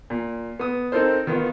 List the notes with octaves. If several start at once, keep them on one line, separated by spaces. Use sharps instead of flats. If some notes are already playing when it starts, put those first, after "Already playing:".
A#2
B3 D#6
C4 D#4 A4 A#4 C5
D#3 B3 D#4 F4